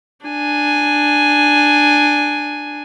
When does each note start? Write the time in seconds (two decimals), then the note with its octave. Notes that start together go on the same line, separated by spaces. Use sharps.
0.26 D4 G#5